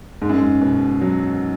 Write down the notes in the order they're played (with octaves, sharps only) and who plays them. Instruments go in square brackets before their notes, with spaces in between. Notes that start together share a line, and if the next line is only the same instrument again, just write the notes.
[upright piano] G#2
F#2
G#2
B2
F#3